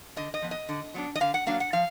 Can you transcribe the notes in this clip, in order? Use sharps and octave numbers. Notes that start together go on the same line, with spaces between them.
D3 D#5
D#5
F3 B3
D#5
D3
F#3 B3 D4
D#5
D3 F5
F#5
F#3 A#3 D4 F5
F#5
F3 F5